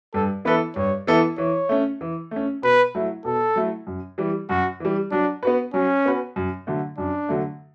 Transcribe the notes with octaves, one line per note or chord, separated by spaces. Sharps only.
G2 A4
E3 B3 E4 A4 B4
G2 C#5
E3 B3 E4 A4
E3 C#5
A3 C#4
E3
A3 C#4
B2 B4
F#3 A3 E4
B2 A4
F#3 A3 E4
F#2
E3 G3
F#2 F#4
E3 G3
F#3 D4
B3 F#4 B4
F#3 C#4
B3 F#4 B4
F#2
D3 F#3 A3
F#2 D4
D3 F#3 A3